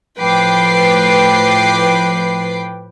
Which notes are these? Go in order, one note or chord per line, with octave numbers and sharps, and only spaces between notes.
A2 F3 B4 G5 D6 C7